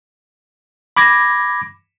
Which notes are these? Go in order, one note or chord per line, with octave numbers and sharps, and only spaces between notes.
B5 D6 G#6 A#6